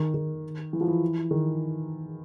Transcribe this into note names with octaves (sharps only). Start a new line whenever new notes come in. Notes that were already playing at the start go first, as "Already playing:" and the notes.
Already playing: D#3
D#3
E3
F3
E3
D#3